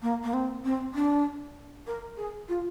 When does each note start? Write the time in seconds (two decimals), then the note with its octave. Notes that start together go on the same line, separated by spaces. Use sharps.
0.02 A#3
0.23 A#3
0.34 C4
0.64 C4
0.94 D4
1.87 A#4
2.17 G#4
2.49 F4